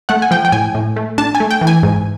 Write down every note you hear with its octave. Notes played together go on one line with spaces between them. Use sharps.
A3 F#5
G#5
F3 G5
G5
A2 G#5
A2
A3
D4 A5
G#5
A3
G5
E3
G#5
G#2